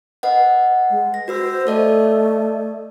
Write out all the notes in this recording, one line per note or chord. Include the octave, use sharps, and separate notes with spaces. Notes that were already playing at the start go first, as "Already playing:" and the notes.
B4 D#5 F#5
G#3
A#6
F#4 B4 C5 E6
A3 A4 D5 D#5